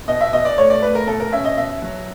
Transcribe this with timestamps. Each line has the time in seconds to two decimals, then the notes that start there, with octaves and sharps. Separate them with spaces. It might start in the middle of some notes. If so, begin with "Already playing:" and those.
0.08 B2 D#5
0.21 E5
0.33 B2 D#5
0.45 D5
0.58 A3 C#5
0.70 D5
0.82 A3 B4
0.95 A#4
1.07 B2 A4
1.20 A#4
1.32 C#4 E5
1.45 D#5
1.57 B2 E5
1.82 F#3